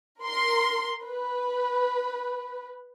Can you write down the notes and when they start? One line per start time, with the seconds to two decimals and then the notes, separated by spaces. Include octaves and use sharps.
0.22 A#4 C6
1.05 B4